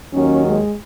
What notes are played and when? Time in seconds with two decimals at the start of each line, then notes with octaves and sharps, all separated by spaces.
0.13 D#2 D#3 F#3 C#4
0.45 G#3